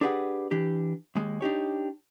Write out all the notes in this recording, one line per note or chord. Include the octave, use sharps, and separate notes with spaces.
D4 G4 G#4 B4 F5 F#5
E3 D4 G4
D#2 G#3
D4 D#4 G4 C#5